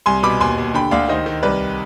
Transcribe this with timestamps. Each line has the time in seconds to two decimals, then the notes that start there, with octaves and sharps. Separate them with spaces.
0.06 C2 G#5 C6
0.23 B2 B5 D6
0.40 D#2 G#5 C6
0.58 D#2
0.74 D3 G5 B5
0.91 D2 D5 F5
1.09 D#3 C5 D#5
1.26 D#3
1.43 C2 B4 D5